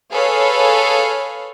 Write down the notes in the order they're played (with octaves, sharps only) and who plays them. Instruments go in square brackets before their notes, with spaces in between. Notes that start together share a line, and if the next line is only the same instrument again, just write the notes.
[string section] G#4 A4 B4 C#5 F5